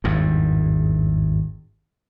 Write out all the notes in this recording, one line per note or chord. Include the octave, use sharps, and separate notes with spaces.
G#1 E2 G2